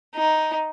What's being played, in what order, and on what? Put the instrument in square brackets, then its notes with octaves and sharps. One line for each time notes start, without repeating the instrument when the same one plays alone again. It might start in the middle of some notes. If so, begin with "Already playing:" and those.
[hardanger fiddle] D#4